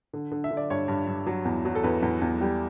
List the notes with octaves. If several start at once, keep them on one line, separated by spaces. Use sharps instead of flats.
D3
D3
E5
D3
D5
G2 C#5
G2
G2
F#3
E2
F#3
A4
E2 B4
E2
E2
G3 G4